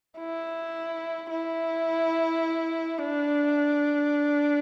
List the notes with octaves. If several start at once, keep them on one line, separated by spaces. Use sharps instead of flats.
E4
E4
D4